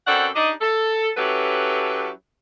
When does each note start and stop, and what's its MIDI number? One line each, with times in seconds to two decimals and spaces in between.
0.06 0.27 42
0.06 0.27 60
0.06 0.27 69
0.06 0.27 73
0.06 0.27 74
0.06 0.27 78
0.35 0.51 62
0.35 0.51 63
0.35 0.51 67
0.35 0.51 74
0.35 0.51 75
0.61 1.10 69
1.16 2.09 54
1.16 2.09 61
1.16 2.09 64
1.16 2.09 67
1.16 2.09 69
1.16 2.09 71